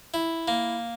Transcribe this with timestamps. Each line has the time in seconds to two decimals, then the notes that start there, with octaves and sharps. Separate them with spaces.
0.14 E4
0.48 A#3